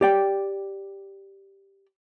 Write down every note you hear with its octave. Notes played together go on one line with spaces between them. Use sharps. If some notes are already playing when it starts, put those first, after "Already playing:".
G4 D5 G5